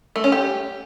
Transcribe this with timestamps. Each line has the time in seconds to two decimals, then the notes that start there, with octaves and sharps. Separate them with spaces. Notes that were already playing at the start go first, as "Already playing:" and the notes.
0.16 A3
0.24 C#4
0.32 G4